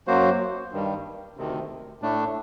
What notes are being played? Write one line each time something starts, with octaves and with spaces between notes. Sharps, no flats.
F#2 F#3 A#3 F#4 C5
G2 D#3 G3
D2 C3 D#3
A2 A3 D4